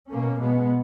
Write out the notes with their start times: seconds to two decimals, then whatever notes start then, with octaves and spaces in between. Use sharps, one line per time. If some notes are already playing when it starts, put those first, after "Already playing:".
0.10 B2 A#3 C#4
0.39 B2 G#3 B3